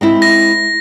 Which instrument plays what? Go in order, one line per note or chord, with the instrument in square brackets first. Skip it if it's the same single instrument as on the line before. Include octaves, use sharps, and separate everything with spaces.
[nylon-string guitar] G#3 C4 E4
[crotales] A#6